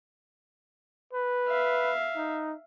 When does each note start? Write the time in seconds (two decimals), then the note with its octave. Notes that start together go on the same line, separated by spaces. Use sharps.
1.13 B4
1.48 E5 F5
2.16 D#4